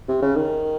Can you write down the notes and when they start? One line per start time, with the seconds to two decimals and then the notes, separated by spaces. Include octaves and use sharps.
0.08 C3
0.22 C#3
0.36 D#3